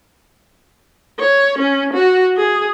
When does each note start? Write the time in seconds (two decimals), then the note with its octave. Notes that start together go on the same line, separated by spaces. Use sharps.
1.20 C#5
1.58 C#4
1.93 F#4
2.37 G#4